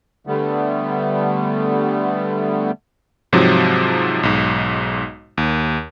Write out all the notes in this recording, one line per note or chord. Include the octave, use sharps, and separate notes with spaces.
D3 G3 A3 B3
G#2 C3 F3 F#3
B1 G#2
D#2